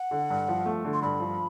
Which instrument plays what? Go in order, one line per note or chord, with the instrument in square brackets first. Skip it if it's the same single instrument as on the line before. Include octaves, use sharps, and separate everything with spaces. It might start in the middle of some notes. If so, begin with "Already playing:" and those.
Already playing: [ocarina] F#5
[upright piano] D3
G2
F3
A3
D3
[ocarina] C6
[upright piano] G2 [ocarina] B5
[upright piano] F3